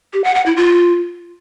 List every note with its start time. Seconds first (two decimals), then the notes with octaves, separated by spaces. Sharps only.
0.13 G4
0.24 F#5
0.35 F#5
0.46 E4
0.57 F4